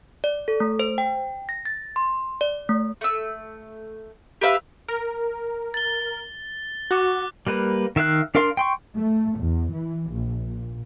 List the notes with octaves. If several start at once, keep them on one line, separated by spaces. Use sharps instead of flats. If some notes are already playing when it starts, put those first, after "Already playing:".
D5
A4
A3
C5
G5
A#6
A6
C6
D5
A3
A3 E6
G4 B4 E5 F5
A#4
A6 G7
F#4 D6 F#6
G3 A#3 B4
D#3 E5 F5 F#6
D4 A#4 F5 C6
G5 C6 C#6
A3
E2
E3
A#1
A#2